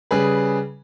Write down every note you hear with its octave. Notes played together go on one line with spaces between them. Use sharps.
C#3 G3 G#4 B4